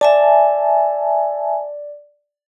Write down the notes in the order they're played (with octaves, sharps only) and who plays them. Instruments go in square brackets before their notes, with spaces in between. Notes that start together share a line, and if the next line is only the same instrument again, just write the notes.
[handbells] D5 [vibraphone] E5 G#5 A5